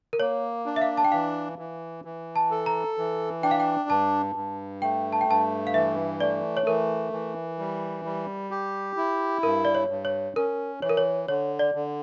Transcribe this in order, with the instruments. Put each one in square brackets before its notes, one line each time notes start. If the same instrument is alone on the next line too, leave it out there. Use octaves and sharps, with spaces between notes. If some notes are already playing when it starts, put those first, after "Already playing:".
[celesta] A#4
[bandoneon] A#3 [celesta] C#5
[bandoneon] D4
[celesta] E5
F5
A5
G5
[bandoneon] E3 [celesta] F5
[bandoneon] E3
E3
[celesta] A5
[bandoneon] A4
[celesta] A#5
[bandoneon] E3
[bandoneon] D4 [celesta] G5
[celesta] F5
G5
[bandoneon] G2 [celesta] A5
[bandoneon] G2
[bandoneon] A3 [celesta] G5
[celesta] A5
G5
[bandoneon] G2 [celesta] A5
[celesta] F5
[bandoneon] E3 [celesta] E5
[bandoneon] A3 [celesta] D5
[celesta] C#5
[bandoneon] E3 [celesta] A#4
[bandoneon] E3
G3
G3
G4
E4
[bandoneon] G2 [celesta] A#4
[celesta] D5
C#5
[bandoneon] G2
[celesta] C#5
[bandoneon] C#4 [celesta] A#4
[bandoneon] E3 [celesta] C#5
[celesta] A#4
C#5
[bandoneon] D3 [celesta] C#5
[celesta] D5
[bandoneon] D3